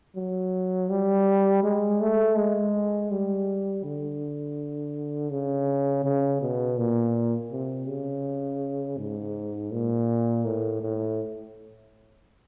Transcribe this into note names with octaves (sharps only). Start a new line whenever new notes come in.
F#3
G3
G#3
A3
G#3
G3
D3
C#3
C#3
B2
A#2
C3
C#3
G#2
A#2
A2
A2